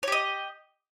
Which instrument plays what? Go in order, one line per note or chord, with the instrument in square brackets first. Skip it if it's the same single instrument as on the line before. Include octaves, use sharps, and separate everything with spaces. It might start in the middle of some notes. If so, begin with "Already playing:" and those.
[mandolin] C#5
G4
D#5